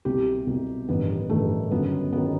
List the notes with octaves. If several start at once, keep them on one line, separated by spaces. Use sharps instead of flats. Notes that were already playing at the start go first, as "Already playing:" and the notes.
C2 B2 G4
C2 B2
A1 G2 D#3 B3
A1 G2 D#3 A3
G1 F#2 D#3 B3
G1 F#2 D#3 B3